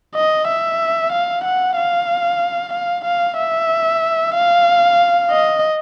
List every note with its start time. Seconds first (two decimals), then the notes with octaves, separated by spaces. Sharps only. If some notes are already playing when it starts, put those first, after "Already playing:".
0.15 D#5
0.47 E5
1.12 F5
1.44 F#5
1.77 F5
2.73 F5
3.05 F5
3.38 E5
4.34 F5
5.31 D#5